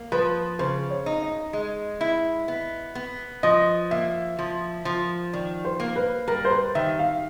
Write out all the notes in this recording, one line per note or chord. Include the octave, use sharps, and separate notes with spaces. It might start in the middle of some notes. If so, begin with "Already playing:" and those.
Already playing: A#3
F3 B4
C#3 C5
C#5
D#4
D#5
G#3
E4
B3
B3
F3 D#5
A#3 E5
F3
F3
D#3 D5
C5
A#3
B4
G3 A#4
C5
B4
D#3 E5
F5